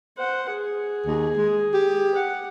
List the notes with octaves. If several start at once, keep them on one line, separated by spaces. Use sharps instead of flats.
C5 F#5
G#4
D#2
G#3
G4
F#5